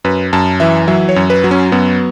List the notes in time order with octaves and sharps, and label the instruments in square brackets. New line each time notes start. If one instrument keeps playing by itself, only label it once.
[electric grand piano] F#2 B4
F#2 A5
E3 E5
F#3 E5
C#5
F#2
B4
F#3
C#4
F#2 B3